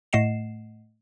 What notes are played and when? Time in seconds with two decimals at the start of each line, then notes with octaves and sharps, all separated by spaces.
0.13 A2 A3 D#5 F#5 C7 E7